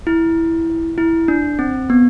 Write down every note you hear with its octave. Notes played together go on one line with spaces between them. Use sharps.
E4
E4
D4
C4
B3